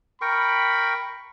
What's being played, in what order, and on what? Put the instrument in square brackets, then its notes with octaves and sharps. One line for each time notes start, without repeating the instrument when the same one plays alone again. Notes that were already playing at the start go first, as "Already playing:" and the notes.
[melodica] A#4 G5 C#6 [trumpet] B5